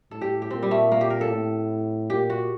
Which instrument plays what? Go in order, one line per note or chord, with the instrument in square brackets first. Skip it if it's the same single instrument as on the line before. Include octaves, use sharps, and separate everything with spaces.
[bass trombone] A2 [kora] A4
[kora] G4
G4
[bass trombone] A#2 [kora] C4
[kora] G3
A3
A#3
G4
A#4
A4
[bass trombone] A2
[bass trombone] A#2 [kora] G4
[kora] F#4